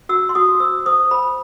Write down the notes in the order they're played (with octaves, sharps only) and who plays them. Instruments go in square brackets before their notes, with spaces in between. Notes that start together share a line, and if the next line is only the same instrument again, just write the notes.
[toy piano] F#4 E6
C6
F#4 D#6
C5 E6
C5 D#6
C5 B5